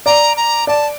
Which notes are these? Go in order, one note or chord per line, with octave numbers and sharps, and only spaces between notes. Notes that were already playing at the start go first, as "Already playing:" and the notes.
D5 A#5
A#5
D5 A5